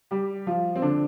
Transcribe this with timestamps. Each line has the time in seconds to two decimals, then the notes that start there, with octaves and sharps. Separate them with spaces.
0.11 G3 G4
0.47 F3 F4
0.76 C4
0.82 D3 D4